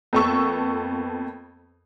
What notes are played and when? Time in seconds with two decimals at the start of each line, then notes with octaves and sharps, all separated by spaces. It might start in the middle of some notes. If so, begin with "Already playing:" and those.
0.13 F2 A#3 B3 A4 C#6 E6